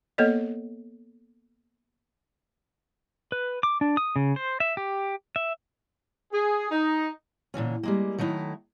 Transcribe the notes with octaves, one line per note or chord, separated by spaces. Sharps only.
A#3 B3 A4 C#5 D#5
B4
D6
D4
D#6
C#3
C5
E5
G4
E5
G#4
D#4
A#2 D3 E3 C#4
G3 G#3 A#3
D#3 F#3 A3 D#4 E4